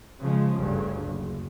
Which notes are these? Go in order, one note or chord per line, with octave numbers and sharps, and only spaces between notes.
C#3 F3 G#3
G1 D2 G2 C#3
F#1